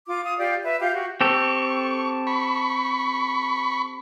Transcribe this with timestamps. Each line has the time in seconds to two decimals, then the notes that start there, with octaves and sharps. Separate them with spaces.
0.07 F4 D6
0.23 F5 D#6
0.37 F4 G4 D5
0.63 B4 E5
0.79 F4 G4 F5 G6
0.93 F#4 G4
1.21 C4 G4 A4 C#6
2.27 B5 C#6